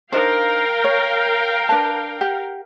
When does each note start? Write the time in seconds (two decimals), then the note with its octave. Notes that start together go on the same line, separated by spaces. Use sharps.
0.12 D4 D#4 A#4 C5 F5 G5
0.84 C#5
1.69 D4 B4 A5
2.21 G4 F#5